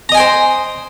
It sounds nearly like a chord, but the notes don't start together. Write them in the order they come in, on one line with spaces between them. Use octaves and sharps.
A#5 D#5 G#5 G5 C5